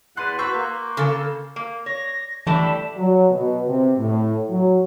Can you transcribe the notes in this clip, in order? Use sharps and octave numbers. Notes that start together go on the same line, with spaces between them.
E2 B4 F#5 C6 F#6 A6 D#7
F#4 B4 C#6 E6 G6 C7
A#3
C#3 A4
A#3
C#5 A#6
E3 G3 A3 D4 A5 B5
F#3
B2
C3
A2
F#3